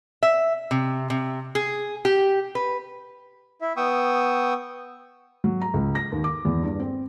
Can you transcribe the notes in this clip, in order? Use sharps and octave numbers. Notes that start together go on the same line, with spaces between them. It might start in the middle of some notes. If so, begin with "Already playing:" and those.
E5
C3
C3
G#4
G4
B4
E4 E5
B3 G5 C#6 D#6 E6
F#3
A#5
C#2
A#6
D#2
D6
E2
G2
C4